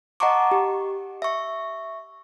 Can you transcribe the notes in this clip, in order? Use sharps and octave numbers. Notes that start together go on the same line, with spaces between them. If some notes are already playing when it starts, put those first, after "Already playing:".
D#5 F#5 A5 A#5 C#6 D6
G4
E5 C#6